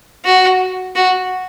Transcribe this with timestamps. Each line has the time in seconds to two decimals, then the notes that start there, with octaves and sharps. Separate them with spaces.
0.25 F#4
0.95 F#4